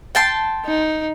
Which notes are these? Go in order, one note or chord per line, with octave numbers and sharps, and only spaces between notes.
G5 A5 C6
D#4